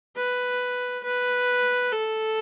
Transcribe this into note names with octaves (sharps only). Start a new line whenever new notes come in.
B4
B4
A4